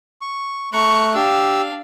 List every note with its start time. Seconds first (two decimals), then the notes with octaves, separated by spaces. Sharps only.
0.21 C#6
0.73 A3 A#5 C#6 F#6
1.15 D4 G4 F5 E6